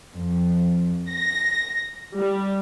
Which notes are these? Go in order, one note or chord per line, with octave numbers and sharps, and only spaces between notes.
F2
A#6
G3